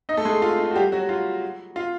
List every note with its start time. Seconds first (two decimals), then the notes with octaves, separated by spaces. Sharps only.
0.09 D#4 D#5
0.17 A3 A4
0.25 G#3 G#4
0.42 F4
0.59 F4
0.71 F#4
0.76 G3 G4
0.92 F#3 F#4
1.09 F4
1.76 F4